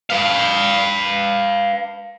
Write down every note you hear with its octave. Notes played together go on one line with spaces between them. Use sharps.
B4 F5